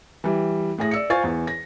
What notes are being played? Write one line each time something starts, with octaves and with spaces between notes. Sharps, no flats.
E3 G3
A2 G#4 A#6
D5 E6 C#7
F4 C5 F5 G#5 C#6 A6
E2
A#6